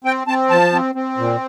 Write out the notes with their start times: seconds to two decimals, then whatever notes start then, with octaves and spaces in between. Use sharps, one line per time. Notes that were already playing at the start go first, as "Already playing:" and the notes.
0.04 C4 G5
0.27 C4 A5
0.50 F3 A5
0.73 C4
0.95 C4
1.18 A#2